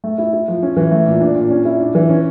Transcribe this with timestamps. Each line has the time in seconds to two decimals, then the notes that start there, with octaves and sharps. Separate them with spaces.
0.04 A3
0.18 E4
0.33 E4
0.48 F3
0.63 C#4
0.76 E3
0.91 A3
1.06 A#2
1.21 D4
1.36 A#2
1.50 C#4
1.65 E4
1.80 D4
1.95 E3
2.09 C#4